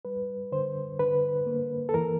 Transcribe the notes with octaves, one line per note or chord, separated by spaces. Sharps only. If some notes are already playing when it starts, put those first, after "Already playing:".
G3 B4
D3 C5
D3 B4
A#3
A4
E3 A#4